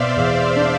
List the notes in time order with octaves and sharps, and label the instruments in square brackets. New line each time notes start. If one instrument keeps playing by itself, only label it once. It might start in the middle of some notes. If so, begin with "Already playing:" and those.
Already playing: [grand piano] B2 B3 [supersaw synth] C5 D5 E5 F5
[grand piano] E2
D4